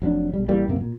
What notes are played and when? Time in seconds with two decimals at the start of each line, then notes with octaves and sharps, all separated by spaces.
0.02 F1 F#3 C#4 D4
0.34 B1 G3
0.48 A1 E3 G3 A#3
0.68 F#2 C3 A#3
0.81 A#2